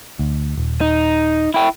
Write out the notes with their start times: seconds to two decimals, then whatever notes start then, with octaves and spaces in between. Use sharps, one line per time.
0.19 D2
0.57 D#1
0.81 D#4
1.54 E4 G5